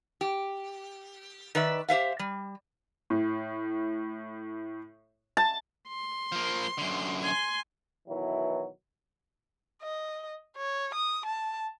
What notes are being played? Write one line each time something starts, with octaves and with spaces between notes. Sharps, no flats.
G4
D#3 B4 D5 E5
G4 C5 E5 F5
G3
A2
A5
C6
F3 A#3
F#2 D3
G#5 C6
B2 D#3 E3 F#3 E4
D#5
C#5
D#6
A5